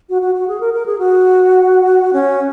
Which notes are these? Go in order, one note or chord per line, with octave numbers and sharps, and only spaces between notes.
F#4
F#4
F#4
G#4
A#4
A#4
G#4
F#4
C#4